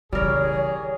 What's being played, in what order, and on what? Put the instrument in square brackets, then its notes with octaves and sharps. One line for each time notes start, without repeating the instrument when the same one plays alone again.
[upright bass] C#3 E3 [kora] G3 A#4 [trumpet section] G#4 [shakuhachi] C#5